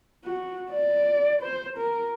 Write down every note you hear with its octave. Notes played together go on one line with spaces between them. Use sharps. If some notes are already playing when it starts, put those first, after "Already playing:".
F#4
D5
C5
A#4